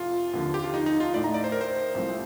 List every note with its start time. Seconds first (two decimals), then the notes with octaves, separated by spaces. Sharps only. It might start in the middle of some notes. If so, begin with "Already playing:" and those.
Already playing: F2 C3 F3 F4
0.33 D#2 D3 F3
0.54 G4
0.64 F4
0.74 D#4
0.86 D#4
1.00 F4
1.14 A2 A3 D#4 D5
1.24 A#5
1.34 D5
1.44 C5
1.52 A#4
1.61 C5
1.95 C2 C3 F3 A3 C4